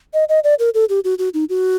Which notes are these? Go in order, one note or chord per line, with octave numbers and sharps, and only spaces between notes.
D#5
D#5
D5
A#4
A4
G4
F#4
F#4
D#4
F#4